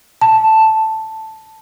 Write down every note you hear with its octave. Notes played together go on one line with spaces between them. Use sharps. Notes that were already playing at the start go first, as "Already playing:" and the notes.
A5